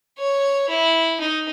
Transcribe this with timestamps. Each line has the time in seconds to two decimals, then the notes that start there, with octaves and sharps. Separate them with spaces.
0.19 C#5
0.69 E4
1.20 D#4